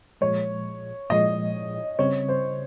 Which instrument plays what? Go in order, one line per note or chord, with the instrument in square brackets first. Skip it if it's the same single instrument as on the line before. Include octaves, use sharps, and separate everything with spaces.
[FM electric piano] A#2 F3 G#3 [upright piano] C#5
[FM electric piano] A#2 F3 G#3 [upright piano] D#5
[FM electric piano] C#3 G3 C4 [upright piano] C#5
[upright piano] C5